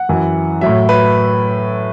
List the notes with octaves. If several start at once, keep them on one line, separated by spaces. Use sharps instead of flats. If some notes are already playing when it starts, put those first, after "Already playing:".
Already playing: F#5
F#2 E3
A2 F#3 E5
B4